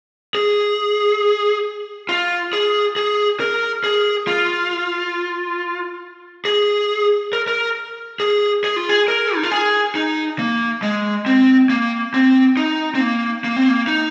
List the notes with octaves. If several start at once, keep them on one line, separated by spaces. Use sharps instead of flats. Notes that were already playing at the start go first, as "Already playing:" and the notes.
G#4
F4
G#4
G#4
A#4
G#4
F4
G#4
A#4
A#4
G#4
G#4
F4
G#4
A#4
D#4
F4
G#4
D#4
A#3
G#3
C4
A#3
C4
D#4
C4
A#3
A#3
C4
A#3
D#4